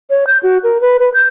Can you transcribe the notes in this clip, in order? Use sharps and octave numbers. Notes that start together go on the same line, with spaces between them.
C#5
G6
F#4
A#4
B4
B4
G6